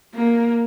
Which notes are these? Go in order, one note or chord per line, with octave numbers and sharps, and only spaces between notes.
A#3